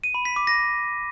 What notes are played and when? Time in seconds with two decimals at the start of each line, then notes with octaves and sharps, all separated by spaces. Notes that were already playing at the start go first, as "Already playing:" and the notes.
0.04 D#7
0.14 B5
0.25 B6
0.36 D6
0.47 A#6